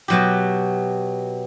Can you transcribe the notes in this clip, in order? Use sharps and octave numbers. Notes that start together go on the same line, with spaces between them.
B2 F#3 G4